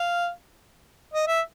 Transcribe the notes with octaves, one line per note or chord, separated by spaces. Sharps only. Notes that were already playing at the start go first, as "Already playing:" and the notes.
Already playing: F5
D#5
E5